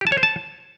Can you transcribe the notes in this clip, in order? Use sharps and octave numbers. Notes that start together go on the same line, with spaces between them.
G4
A5
C#5
C5
A5